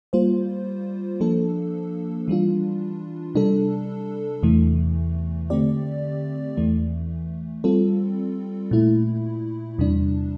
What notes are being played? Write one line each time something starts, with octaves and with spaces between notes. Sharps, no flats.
G3 A#3 F4 C5
F3 A#3 D4 A4
E3 G3 D4 F4
C3 G3 D4 A4
E2 C3 E3 A3
D3 A3 C4 G4 D5
E2 E3 A3
G3 C4 F4 A4
A#2 A3 E4
E2 C3 G3 D4